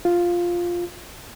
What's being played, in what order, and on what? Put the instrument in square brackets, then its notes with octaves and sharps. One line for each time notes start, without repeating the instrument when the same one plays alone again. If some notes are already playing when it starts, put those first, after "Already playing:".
[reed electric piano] F4